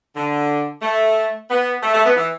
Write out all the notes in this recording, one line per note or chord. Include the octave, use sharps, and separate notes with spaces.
D3
A3
B3
A3
A3
B3
E3